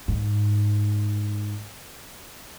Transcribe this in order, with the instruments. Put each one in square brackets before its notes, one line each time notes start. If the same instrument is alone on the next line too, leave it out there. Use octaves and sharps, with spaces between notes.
[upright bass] G#2